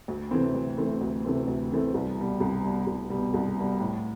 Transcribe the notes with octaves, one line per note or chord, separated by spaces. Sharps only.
D2
C3 E3 A3 C4
D2
C3 E3 A3 C4
D2
C3 E3 A3 C4
D2
C3 E3 A3 C4
C2
B2 G3
C2
B2 G3
C2
B2 G3
C2
B2 G3
A2